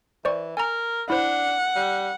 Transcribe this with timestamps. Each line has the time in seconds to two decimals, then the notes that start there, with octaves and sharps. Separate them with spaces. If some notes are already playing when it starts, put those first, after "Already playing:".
0.25 E3 C5 D5 C#6
0.57 A#4 G#5 A#5
1.10 D4 E4 C5 F#5
1.76 G3